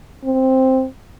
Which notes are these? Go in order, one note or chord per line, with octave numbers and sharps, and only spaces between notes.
C4